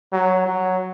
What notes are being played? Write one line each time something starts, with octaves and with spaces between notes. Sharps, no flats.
F#3
F#3